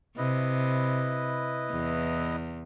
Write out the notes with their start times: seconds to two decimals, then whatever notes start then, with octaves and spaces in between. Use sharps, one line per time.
0.17 C3 E4 B4 D#5
1.70 E2